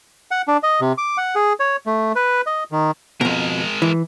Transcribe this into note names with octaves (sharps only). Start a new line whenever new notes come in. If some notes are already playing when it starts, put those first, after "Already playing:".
F#5
D4
D#5
C3
D6
F#5
G#4
C#5
A3
B4
D#5
D#3
F2 B2 G#3 A#4
E3